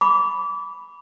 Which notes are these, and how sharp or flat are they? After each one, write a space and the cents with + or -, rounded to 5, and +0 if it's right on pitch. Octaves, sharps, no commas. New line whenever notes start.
B5 +0 D6 -30